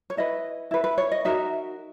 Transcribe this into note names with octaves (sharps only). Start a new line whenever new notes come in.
C#5
E4 B4 D#5
E4 B4
B4
C#5
D#5
D#4 F#4 A#4 E5